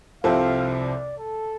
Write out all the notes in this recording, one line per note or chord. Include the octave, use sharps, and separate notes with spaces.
C2 C3 F3 C4 A4 F5
D5
A4